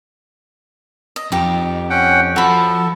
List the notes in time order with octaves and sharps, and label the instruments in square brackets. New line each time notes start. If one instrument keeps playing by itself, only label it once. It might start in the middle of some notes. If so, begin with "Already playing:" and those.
[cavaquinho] D#5
[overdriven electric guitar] F2 [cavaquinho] D#4 G4
[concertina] C#4 F#5 G5
[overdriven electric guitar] F3 [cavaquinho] F#4 B5 [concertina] A4